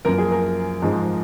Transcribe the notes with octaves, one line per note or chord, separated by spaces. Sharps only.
F#2 F3 A#3 A#4
G#4
A#4
G#2 F3 G#3